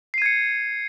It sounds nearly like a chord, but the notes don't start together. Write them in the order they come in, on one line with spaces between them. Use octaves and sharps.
C7 D#7 G#6 C#7